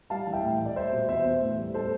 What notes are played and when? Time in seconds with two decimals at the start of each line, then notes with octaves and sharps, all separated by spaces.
0.10 G3 F5 A5
0.27 E3
0.33 E5 G5
0.43 A2
0.60 A2
0.65 D5
0.76 G3 C5 E5
0.92 B2
1.08 E2 C5 E5
1.25 E2
1.42 A2
1.58 G3
1.74 G3 A4 C5